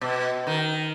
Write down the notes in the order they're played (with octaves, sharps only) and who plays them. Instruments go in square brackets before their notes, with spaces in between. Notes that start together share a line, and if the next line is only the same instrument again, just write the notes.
[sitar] B2
D#3